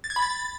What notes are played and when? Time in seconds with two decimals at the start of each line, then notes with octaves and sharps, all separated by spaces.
0.04 A6
0.10 G#6
0.16 B5
0.22 A6